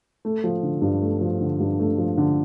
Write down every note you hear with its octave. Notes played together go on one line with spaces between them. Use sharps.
A3
F3
D3
G2
A3
F3
D3
G2
A3
F3
D3